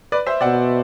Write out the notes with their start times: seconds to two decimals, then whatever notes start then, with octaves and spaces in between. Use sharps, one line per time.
0.12 B4 D5
0.26 C5 E5
0.41 B2 D5 F#5